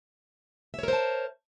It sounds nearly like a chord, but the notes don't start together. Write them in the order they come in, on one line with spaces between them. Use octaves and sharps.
E5 C#5 A#4 C5 A5